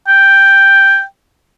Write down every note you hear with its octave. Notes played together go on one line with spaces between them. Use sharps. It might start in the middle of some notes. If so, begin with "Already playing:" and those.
G5